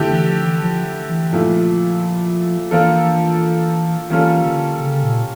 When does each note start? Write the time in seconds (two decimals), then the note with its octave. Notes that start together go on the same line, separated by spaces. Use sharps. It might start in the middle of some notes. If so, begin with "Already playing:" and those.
Already playing: D3 A3 E4 G4
0.11 E3
0.28 F3
0.45 E3
0.63 F3
1.09 E3
1.32 A#2 F3 A3 E4
2.71 E3 F3 A#3 D4 F4 A4
4.10 E3 G3 A#3 C#4 F4 A4
4.45 D3
4.80 C#3
5.03 A#2